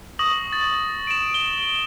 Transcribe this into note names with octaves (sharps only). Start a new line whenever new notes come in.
C#6 D#6 A#6 F#7
A6
D7 E7
G7